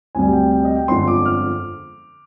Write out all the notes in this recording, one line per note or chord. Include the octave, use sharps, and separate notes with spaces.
D2 C3 G3 G#5
G5
G5
D#5
G5
G1 F2 D3 G#3 C6
D6
F6